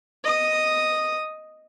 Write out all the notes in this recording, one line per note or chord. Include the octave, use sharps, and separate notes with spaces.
D#5 D#6